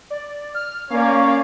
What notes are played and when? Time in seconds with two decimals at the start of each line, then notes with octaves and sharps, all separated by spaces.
0.10 D5
0.55 F6
0.90 A#3 C#4 C#5 D5 F5